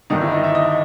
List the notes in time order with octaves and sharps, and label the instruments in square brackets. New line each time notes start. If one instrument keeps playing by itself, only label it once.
[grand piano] G1 G2 D#3 D#4
E4
D#5
E5
D#5